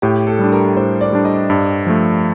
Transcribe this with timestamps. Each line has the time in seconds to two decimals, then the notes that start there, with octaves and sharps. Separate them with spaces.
0.02 A2 G4
0.27 A4
0.39 G3 D4
0.52 A#4
0.76 A2 C5
1.01 D5
1.12 G3 D4
1.25 D#5
1.50 G2
1.87 F3 A3